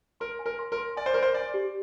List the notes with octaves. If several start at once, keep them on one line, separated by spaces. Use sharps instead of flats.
A#4 C6
G#5
A#4
C6
A#4
C6
D5 G#5
C5
A#4 C6
C5
D5 G#5
G4